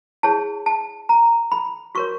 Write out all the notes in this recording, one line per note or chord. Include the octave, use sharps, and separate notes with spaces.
E4 G#4 C#5 A5
A5
A#5
B5
F#4 A#4 C#5 C#6